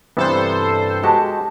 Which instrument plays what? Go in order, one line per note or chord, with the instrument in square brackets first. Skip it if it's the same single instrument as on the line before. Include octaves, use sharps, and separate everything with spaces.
[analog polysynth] G2 A4 C5 [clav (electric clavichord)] C3 E3 B3
[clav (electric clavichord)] G#3 F#4 G4 [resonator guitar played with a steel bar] A5